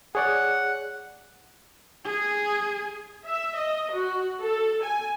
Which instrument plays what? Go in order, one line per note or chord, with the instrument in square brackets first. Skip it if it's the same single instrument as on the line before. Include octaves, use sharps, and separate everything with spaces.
[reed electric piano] G#4 C#5 D5 [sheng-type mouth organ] F#5
[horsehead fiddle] G#4
[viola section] E5
D#5
F#4
A4
G#5